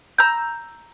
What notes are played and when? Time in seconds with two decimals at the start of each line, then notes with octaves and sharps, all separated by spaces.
0.18 A#5 E6 G6